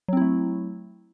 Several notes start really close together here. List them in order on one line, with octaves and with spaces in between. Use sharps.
F#3 C4 E4 A3